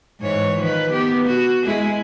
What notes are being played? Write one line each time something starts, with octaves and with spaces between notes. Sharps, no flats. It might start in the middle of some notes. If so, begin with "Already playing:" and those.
G#2 E3 C#5
D#3 F3 B4
B3 G4
F#4
G#3 E4 G#4